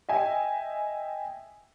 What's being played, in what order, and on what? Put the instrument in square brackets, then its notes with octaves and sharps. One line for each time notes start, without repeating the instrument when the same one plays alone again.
[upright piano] D#5 E5 G5 G#5